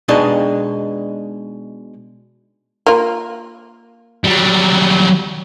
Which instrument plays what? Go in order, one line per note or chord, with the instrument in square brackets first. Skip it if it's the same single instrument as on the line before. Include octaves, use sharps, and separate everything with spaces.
[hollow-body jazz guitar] B2 G#3 D4 D#4 D#5
[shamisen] A#3 F4
[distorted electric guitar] F#3 G3